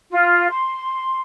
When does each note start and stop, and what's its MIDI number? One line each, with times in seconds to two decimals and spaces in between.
0.11 0.49 65
0.49 1.22 84